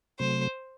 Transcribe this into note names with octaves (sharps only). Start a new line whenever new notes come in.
C3 F#3 A3 C5